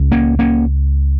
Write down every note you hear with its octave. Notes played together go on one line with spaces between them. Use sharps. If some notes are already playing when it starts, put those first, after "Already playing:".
Already playing: C#2
A#3 C#4
A#3 C#4